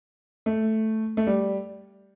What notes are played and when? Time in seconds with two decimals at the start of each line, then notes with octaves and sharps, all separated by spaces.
0.46 A3
1.17 A3
1.27 G3